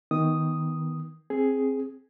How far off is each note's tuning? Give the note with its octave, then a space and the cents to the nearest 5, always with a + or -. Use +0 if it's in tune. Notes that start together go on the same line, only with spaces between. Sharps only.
D#3 +20 B3 +0 D#6 +0
C4 +15 G#4 +5